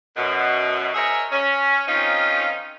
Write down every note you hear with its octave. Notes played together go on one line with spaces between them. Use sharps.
F#2 B2
G#4 A#4 C5 C#5 D#5 E5
C#4
D#3 F3 C4 C#4 D#4 F4